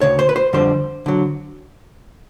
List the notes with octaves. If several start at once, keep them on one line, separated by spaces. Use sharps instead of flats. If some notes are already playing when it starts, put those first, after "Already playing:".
D2 C#3 C#5
C5
B4
C5
F2 D3 G3 C5
D3 F#3